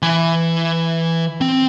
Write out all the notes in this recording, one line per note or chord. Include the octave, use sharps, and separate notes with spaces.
E3 G#5
C4